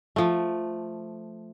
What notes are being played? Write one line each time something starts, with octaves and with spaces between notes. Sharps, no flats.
F3 A3